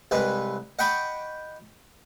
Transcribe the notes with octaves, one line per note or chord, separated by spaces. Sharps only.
C2 G#3 B4
D#5 F#5 G5 B5 C#6 D6